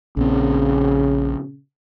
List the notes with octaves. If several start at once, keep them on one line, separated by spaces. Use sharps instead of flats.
A#1 C#3 C4